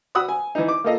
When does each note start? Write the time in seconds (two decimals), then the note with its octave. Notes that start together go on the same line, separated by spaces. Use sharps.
0.15 F#4 F#5 B5 D#6 E6 F#6
0.29 G#5
0.55 E3 D#4
0.68 D6
0.84 A#3 F4 A4 D#5 F5